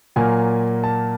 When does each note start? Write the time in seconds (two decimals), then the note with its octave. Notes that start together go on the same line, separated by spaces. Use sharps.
0.16 A#2 F#3 A#3 G#5
0.84 A5